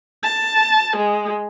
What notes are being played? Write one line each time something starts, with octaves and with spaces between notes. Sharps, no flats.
A5
G#3